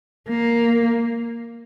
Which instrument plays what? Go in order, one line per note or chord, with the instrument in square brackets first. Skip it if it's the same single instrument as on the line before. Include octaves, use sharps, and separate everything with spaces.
[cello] A#3